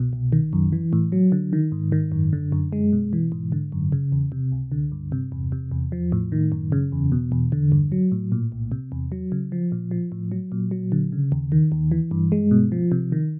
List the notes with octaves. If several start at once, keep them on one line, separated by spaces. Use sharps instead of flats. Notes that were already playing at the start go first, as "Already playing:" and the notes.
Already playing: C2 B2
C2
D#3
F#2
E3
A2
F#3
D3
D#3
G#2
D#3
F#2
D3
F#2
G#3
B2
E3
G#2
D3
F#2
C#3
E2
C3
C#2
D3
G2
C3
E2
C3
E2
F3
A2
D#3
F#2
C#3
E2
B2
E2
D3
G2
F#3
A2
A#2
C2
C3
E2
F#3
C#3
F3
A#2
F3
A2
F#3
A#2
F#3
D3
C#3
D#2
D#3
D#2
E3
G2
G#3
B2
F3
C3
D#3